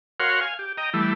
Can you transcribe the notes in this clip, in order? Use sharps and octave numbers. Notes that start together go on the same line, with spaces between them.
F#4 A#4 C#5 F5 F#5 C6
F5 G#5
G4
D#5 G5 A#5
E3 G3 A3 E4